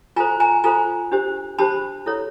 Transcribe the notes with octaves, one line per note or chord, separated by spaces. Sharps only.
F4 A4 C5 G#5 A#5
G#5 A#5
F4 A4 C5 G#5 A#5
D4 G4 C5
D4 G4 C5 A5 B5
E4 A4 C#5